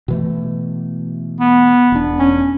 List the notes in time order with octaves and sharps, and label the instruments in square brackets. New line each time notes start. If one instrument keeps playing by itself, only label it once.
[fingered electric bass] B2 E3 A3
[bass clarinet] B3
[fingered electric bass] E1 D4
[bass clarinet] C#4